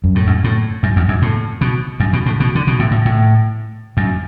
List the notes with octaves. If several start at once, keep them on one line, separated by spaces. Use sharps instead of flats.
F#2
A2
F#2
A2
F#2
E2
F#2
A2
B2
F#2
B2
A2
B2
D3
B2
A2
A2
A2
F#2